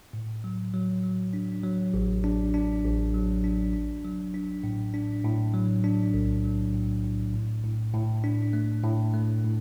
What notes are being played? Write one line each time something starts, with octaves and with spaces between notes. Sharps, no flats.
A2
F#3
F#3
F#3
D4
F#3
A1
D4
D4
A1
F#3
D4
D4
F#3
D4
A2
D4
A2
F#3
D4
B1
F#3
A2
A2
A2
A2
A2
D4
A3
A2
A3
A2